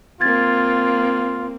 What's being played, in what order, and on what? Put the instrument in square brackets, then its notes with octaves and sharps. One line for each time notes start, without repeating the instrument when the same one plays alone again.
[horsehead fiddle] A#3 C4 [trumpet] F4 [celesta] G#6 A6